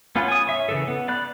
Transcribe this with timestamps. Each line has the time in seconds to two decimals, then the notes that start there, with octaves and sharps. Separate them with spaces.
0.16 B3 C#4 F4 B4
0.28 G#5 D#6
0.47 C#5 E5
0.69 C#3 E3 A4
0.88 B3
1.08 D5 B5 F#6